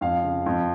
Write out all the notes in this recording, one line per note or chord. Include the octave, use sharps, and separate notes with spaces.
F2 F5
C#3
F2